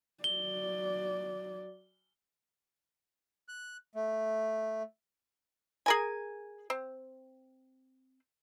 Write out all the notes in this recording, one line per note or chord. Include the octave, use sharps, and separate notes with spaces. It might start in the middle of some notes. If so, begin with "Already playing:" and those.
F#3 D5 G7
F#6
A3
G#4 A#4 G#5
C4